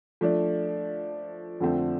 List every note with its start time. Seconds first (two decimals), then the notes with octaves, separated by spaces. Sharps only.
0.21 F3 A3 D4
1.60 F2 D3 F3 A3 C4